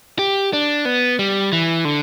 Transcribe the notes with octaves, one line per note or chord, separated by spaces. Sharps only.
G4
D4
B3
G3
E3
D3